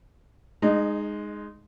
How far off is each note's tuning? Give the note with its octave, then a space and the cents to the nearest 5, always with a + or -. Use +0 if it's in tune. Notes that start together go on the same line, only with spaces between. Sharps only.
G#3 +0 D#4 -20